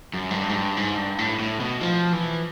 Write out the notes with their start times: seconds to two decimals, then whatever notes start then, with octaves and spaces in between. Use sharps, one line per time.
0.14 F#2
0.31 G#2
0.34 G2
0.49 G#2
0.56 G2
0.77 G#2
0.97 G2
1.19 A2
1.40 A2
1.60 B2
1.81 F3
2.13 E3